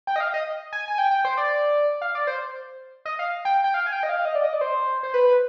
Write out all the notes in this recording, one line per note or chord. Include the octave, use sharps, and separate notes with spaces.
G5
D#5
F5
D#5
G#5
G#5
G5
G5
C5
D5
F5
D5
C5
D#5
F5
G5
G5
F5
G#5
G5
D#5
F5
D#5
D5
D#5
D5
C5
C5
B4